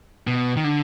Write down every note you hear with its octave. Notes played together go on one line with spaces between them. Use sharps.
B2
D#3
D3